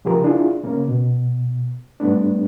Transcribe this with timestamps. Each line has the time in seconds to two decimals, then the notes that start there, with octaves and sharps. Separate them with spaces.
0.05 C#3 F3 G4 G#4 A#4
0.24 D4 E4 F4 G#4
0.63 C#3 A#3 C#4
0.88 B2
2.00 G#2 G3 A3 B3 D4